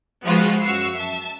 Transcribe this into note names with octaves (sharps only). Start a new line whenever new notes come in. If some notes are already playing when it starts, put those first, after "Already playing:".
F3 G#3 B3 F4 F#4
F#2 F#4 F5 C#6 E6 C7
E5 A5